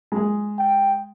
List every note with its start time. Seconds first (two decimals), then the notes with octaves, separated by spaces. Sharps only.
0.12 G#3 G#4
0.59 G5